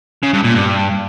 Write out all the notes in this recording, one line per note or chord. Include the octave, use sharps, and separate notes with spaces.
C#3
G2
A#2
G2